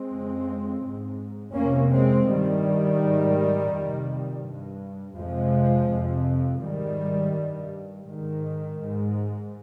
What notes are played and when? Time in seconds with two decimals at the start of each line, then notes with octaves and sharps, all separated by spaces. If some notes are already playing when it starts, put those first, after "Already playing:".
Already playing: G#3 C4
0.10 F2 C#3
0.82 G#2
1.54 F2 C3 A#3 C#4
1.91 G#3 C4
2.27 G2 D#3 G3
3.00 G#2
3.72 F2 C3
4.44 G2
5.17 F2 C3 F3 G#3
5.90 F2 C3
6.62 G#2 D#3 G3
7.34 G2
8.07 G#2 D#3
8.79 G#2